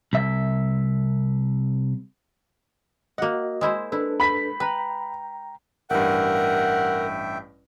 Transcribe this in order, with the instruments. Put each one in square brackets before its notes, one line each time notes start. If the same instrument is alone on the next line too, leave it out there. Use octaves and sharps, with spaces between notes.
[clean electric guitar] C2 E5
[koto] A#3 F#5 [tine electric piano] F#4 D#5
[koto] G#3 E4 C5
[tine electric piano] D4 A4 B4 [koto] E4
[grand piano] B5 B6
[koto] B4 [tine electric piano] G5 A#5
[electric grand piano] A1 G2 [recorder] A#4 [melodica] E5 G5 [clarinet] F#5